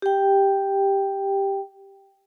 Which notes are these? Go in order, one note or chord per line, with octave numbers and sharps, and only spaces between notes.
G4 G5